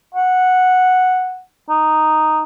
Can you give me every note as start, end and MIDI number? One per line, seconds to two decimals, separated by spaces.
0.14 1.40 78
1.69 2.43 63